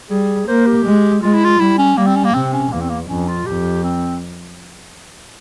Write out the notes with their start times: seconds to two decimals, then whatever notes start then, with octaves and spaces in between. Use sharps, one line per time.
0.10 G3 G#4
0.48 A#3 C5
0.66 G4
0.86 G#3
1.23 G#3 F4
1.34 E4
1.44 F4
1.60 G3 E4
1.78 C#4
1.97 G3 A#3
2.07 C4
2.16 C#4
2.25 A#3
2.34 C3 C4
2.53 C#4
2.72 E2 A#3
2.81 C4
2.90 A#3
3.09 F2 C#4
3.28 F4
3.46 F2 G4
3.84 C4